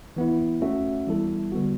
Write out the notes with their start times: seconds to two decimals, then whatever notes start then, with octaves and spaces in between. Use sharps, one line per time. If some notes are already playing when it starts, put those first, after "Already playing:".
0.17 E3 B3 E4
0.61 A3 C#4 F#4 A4 E5
1.07 E3 G3 B3 E4 A4
1.52 D3 G3 B3 F#4